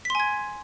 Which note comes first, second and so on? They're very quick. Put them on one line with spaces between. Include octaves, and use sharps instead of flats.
B6 C6 G#5 G#6